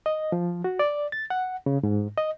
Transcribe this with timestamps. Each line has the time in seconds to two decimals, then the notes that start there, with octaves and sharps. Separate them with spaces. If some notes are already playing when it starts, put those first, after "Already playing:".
0.06 D#5
0.32 F3
0.64 F#4
0.79 D5
1.12 A6
1.30 F#5
1.66 C#3
1.83 G#2
2.18 D#5